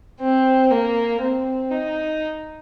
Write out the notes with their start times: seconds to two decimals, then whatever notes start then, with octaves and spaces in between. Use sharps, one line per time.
0.20 C4
0.71 A#3
1.21 C4
1.71 D#4